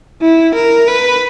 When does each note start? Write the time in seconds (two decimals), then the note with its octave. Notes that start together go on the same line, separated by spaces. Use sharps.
0.21 E4
0.55 A#4
0.88 B4